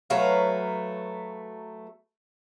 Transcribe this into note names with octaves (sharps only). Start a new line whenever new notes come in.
F#3 A3 B4 F5